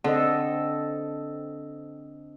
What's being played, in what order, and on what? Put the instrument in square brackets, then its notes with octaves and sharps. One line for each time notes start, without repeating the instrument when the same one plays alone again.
[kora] D3 [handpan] C4 A4 D#5